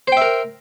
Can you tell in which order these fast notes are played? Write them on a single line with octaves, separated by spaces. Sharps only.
C5 G5 E5 A#4